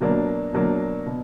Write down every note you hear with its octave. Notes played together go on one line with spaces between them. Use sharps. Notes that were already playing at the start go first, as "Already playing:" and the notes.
B2 F#3 A#3 D4
B2 F#3 A#3 D4
B2